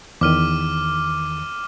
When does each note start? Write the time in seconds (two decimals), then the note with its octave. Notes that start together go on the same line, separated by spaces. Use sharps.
0.21 E2 D#3 D6 F6 D#7